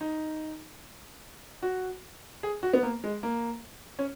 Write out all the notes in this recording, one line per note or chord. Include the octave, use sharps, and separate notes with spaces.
D#4
F#4
G#4
F#4
B3
A#3
G#3
A#3
C#4